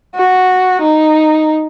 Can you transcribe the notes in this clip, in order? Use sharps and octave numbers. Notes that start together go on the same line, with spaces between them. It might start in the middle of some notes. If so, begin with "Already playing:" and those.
F#4
D#4